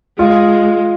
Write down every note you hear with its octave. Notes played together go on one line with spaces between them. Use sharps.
G#3 F4